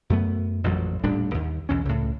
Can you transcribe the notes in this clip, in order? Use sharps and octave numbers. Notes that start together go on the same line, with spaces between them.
F#2 F#3 A3 B3
A1 F2 A#2 F#3
D#1 A2 G3 D4
D#2
B1 E2 C#4
C#2 A2